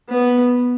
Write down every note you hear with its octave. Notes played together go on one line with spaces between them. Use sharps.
B3